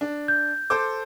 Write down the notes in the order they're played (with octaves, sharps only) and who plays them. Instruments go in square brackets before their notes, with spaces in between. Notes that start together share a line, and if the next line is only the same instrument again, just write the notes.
[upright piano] D4
[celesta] G6
[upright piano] A4 C5 D6